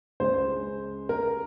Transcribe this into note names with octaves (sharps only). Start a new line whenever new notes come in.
C#2 C#3 G#3 C5
A#4